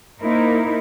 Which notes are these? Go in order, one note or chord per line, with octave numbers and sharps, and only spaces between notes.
A#3 D#4 E4 A#4 C5